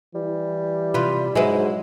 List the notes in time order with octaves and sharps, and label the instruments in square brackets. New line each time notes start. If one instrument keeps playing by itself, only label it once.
[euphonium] E3 [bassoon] G3
[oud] C3 F4 [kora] B4
[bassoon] G#2 [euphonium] F#3 [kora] G#3 [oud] E4 F#4 B4